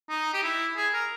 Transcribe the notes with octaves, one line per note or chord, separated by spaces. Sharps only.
D#4
G4
E4
G#4
A#4